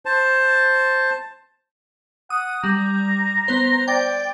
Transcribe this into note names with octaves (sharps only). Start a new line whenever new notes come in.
C5 A5
F#5 D#6
G3 A#5
B3 C5
D5 G5